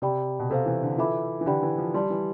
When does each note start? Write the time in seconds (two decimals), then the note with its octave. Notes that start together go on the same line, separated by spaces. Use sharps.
0.02 C3 G4 D5 G5 B5
0.39 B2
0.50 C3 A4 C5 F5
0.66 E3
0.83 D3
0.98 E3 F4 A4 E5 B5 D6
1.41 E3
1.46 D3 G4 D5 G5 B5
1.63 E3
1.78 F3
1.94 G3 G4 D5 A5 C6
2.10 E3